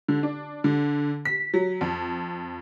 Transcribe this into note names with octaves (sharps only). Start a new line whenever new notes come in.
D3
D4
D3
B6
F#3
F2